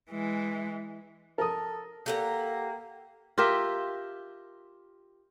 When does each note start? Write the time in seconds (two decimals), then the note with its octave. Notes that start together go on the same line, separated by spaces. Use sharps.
0.11 E3 G#3
1.38 A4 A#4 D#6
2.06 A#3 G4 A4 F#5 A#5
3.38 F4 G4 A#4 E5